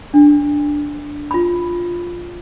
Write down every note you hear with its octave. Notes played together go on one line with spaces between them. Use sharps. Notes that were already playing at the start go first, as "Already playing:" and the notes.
D4
F4 B5